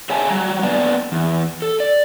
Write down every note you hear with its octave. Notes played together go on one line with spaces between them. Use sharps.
G#4 C#5 E5 F5 G#5 A5
F#3 G3 A#5
A#3 B3 D4 B4 D5 A#5
E2
A4
D5